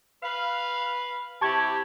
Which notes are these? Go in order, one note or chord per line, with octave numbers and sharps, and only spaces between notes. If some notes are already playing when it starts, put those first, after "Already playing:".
B4 F5
C3 E4 G4 A5 C#6 G#6